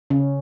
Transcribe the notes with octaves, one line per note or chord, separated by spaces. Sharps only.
C#3 C#4